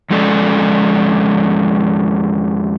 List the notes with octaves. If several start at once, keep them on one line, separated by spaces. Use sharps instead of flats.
F2 G#3 C#4 A4 D5